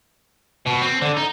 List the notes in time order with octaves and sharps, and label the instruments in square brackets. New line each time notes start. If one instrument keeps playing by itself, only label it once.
[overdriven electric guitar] B2
C4
D3
D#4